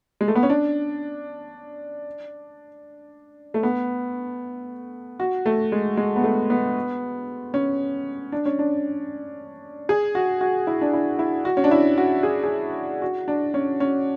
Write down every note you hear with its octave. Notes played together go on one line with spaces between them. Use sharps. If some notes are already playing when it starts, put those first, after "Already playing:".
G#3
A3
B3
C#4
D4
A3
B3
F#4
A3
G#3
G#3
B3
A3
B3
C#4
D4
C#4
D4
G#4
F#4
F#4
E4
D4
E4
E4
F#4
C#4
D4
E4
F#4
G#4
G#4
F#4
D4
C#4
C#4